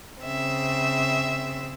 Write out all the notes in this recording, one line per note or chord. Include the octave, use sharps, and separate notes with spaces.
C#3 C4 E5